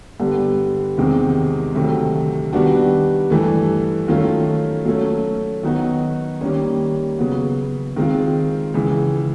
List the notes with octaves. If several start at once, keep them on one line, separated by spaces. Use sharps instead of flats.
G2 D3 G3 B3
E2 C3 D#3 G#3 C4
D2 C3 D#3 F#3 A3
D#3 G3 B3 D4 F#4
G2 E3 A3
D#3 F#3 A3 C#4 F4
F#3 A3 C#4
D#3 F#3 B3 D#4 F#4
D#3 G3 A#3 C#4
C#3 F#3 B3
D#3 G#3 C4 F4
C#2 C#3 E3